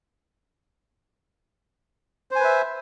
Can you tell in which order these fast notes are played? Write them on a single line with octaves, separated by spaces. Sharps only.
C5 G#5 B4 E5